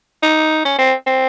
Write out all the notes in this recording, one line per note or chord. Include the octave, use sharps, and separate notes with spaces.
D#4
C#4
C4
C4